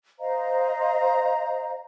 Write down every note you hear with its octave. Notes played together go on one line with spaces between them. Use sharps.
C5 D#5 F5 A#5